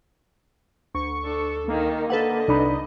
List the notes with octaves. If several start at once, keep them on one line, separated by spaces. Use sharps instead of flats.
D2 C#6
D4 A4
D#3 A#3 D#4
D3 A4 B4 D#5 F#5
C2 D4 D#4 B5